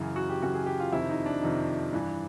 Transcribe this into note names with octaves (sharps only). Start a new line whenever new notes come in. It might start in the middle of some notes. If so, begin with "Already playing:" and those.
Already playing: F#2 C#3 E3
F#4
G4
F#2 C#3 E3 F#4
G#4
G4
F4
F2 C3 D#3 E4
D#4
D4
F2 C3 D#3
G2 E3